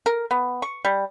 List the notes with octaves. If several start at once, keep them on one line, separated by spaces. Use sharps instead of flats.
A#4
B3
C#6
G3